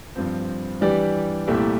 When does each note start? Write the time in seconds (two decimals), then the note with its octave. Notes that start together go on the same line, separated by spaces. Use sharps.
0.15 G2 F3 C4
0.81 E3 G3 D4 G4 D5
1.47 C2 A#2 A3 E4 G4